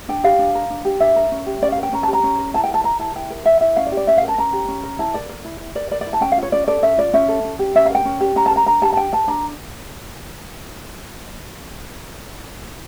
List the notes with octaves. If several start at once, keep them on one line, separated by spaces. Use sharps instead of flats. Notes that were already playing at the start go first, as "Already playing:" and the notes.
D4 G5
G4 F5
D4
A#4
D4
G4
D4 E5
A#4
C#4
G4
C#4 D5
A#4 F5
G5
C#4 A#5
A5
G4
A#5
C#4
A#4
E4 A5
G5
A#4
A5
A#4 A#5
E4 A5
E4 G5
A#4
A#4 E5
E4 E5
C#4 F5
D5
G4
D5
C#4 E5
F5
A#4
A5
C#4 A#5
G4
C#4
A#4
E4 A5
A#4 D5
A#4
E4
E4
A#4 D5
A#4 D5
D5
E4
A5
C#4 G5
F5
F4 C#5
C#4 D5
A4 D5
C#4 E5
F4 D5
C#4 E5
A4
C#4
G4
C#4 E5
F5
A#4
G5
C#4
G4
C#4 A#5
A5
A#4
A#5
D4 A#5
G4 A5
A5
D4 G5
A#4 A5
D4 A#5